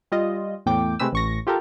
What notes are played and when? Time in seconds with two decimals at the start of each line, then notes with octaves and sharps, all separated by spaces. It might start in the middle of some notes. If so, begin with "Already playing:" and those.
0.12 G3 F4 D#5
0.66 E2 A2 G5 D6
0.99 C3 G#3 A3 G4 B4 E6
1.13 A1 C#6 A#6
1.47 F4 G4 A4 A#4